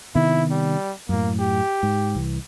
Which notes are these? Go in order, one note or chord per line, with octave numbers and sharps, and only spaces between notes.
C3 D#3 B3 E4
G3
F#2 A2 A#3
G4
G#2
C2 E3